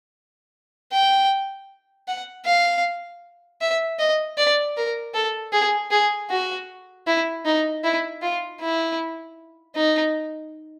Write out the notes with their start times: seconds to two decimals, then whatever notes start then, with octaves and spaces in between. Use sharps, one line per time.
0.92 G5
2.08 F#5
2.46 F5
3.62 E5
3.99 D#5
4.38 D5
4.77 A#4
5.14 A4
5.53 G#4
5.91 G#4
6.30 F#4
7.07 E4
7.45 D#4
7.84 E4
8.22 F4
8.60 E4
9.76 D#4